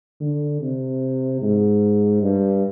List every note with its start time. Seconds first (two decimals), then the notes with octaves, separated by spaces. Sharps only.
0.21 D3
0.61 C3
1.42 G#2
2.22 G2